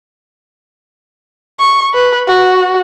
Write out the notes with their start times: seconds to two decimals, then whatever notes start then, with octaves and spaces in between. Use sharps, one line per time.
1.60 C#6
1.94 B4
2.27 F#4